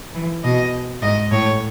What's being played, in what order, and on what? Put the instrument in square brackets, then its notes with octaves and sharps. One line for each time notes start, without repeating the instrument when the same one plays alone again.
[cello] E3
[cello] B2 [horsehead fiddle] D#5
[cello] G#2 [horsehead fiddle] D#5
[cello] A2 [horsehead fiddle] C#5